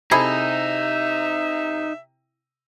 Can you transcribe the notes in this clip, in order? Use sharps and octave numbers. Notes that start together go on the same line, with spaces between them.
C3 D#4 E4 G#4 A4 E5